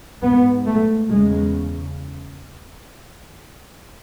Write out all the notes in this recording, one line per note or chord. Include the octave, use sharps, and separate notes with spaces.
G#2 B3
A3
E2 C#3 G#3